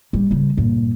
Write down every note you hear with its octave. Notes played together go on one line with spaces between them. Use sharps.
G3
C#3 G3
G2 A#2